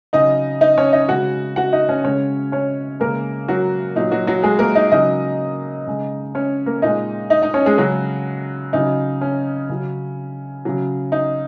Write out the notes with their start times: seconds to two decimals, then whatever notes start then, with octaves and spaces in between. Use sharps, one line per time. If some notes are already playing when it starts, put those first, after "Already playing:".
0.13 C#3 F#3 D#4 D#5
0.61 D#4 D#5
0.77 C#4 C#5
0.93 D#4 D#5
1.09 C#3 G#3 F#4 F#5
1.56 F#4 F#5
1.73 D#4 D#5
1.89 C#4 C#5
2.04 C#3 G#3 C#4 C#5
2.52 C#4 C#5
3.00 C#3 G#3 A#3 A#4
3.48 F#3 F#4
3.96 A#2 F#3 D#4
4.12 F#3 F#4
4.27 F#3 F#4
4.43 G#3 G#4
4.59 A#3 A#4
4.75 D#4 D#5
4.92 C#3 F#3 D#4 D#5
5.87 C#3 G#3
6.35 C#4 C#5
6.66 A#3 A#4
6.82 A#2 G#3 D#4 D#5
7.30 D#4 D#5
7.42 D#4 D#5
7.54 C#4 C#5
7.66 G#3 G#4
7.78 C#3 F#3 F#4
8.73 C#3 F#3 D#4
9.21 C#4
9.69 C#3 F#3
10.65 C#3 F#3
11.12 D#4